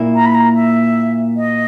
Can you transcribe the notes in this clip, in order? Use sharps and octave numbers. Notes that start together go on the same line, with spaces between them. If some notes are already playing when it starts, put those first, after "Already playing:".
Already playing: A#2 A#3 E4
A#5
B5
A#5
E5
D#5